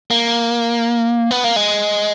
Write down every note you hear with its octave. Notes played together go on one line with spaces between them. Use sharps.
A#3
B3
A#3
G#3